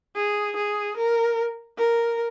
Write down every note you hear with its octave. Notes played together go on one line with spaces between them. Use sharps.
G#4
G#4
A#4
A#4